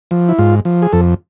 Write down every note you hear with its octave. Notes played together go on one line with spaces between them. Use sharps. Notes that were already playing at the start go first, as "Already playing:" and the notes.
F3
E4
G#2 F4
F3
G#4
F2 A4